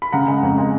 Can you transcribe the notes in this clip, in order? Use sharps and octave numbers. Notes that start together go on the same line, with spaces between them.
B5
C#3 F#5 A#5
G#3
F2
G#3